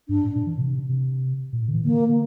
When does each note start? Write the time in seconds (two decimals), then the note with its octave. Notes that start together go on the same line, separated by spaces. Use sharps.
0.09 G2 D4
0.24 A2
0.36 A#2
0.47 E3
0.57 C3
0.89 C3
1.53 A#2
1.63 A2
1.69 D3
1.74 E3
1.84 D3 A#3